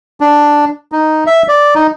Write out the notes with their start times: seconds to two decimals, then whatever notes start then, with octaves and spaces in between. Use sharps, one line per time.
0.21 D4
0.92 D#4
1.26 E5
1.48 D5
1.75 D#4